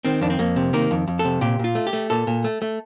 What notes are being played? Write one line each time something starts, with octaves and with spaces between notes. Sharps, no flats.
D#3 C4
F2 D4
C4
F2 A#3
C3
D#3 A#3
F2
F2
A4
C3
A#2 G4
A#2 F4
A3
G4
A3
A#2 A4
A#2
A3
A3